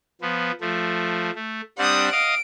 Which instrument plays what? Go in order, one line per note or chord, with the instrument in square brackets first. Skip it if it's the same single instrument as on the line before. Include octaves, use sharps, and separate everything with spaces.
[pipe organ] F3 B3
F3 A3
A3
[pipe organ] G3 C4 D4 [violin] F#5 D#6
[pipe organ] D#5 F5 D#6 [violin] D7